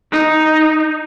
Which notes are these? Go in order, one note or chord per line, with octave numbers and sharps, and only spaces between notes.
D#4